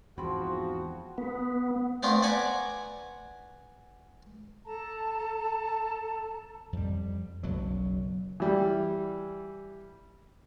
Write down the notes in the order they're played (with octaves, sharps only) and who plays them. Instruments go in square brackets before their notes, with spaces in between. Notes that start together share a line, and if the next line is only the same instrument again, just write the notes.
[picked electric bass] E2 G#2 [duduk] F3 [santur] C4 B5 [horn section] F4 F#4
[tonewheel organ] B3
[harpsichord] A3 B3 C4 D4 F4
B4 D5 F#5 G#5 A#5
[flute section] A4 A5 A#5
[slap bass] F2 G3
F#1 B1 F#3
[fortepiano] E3 G3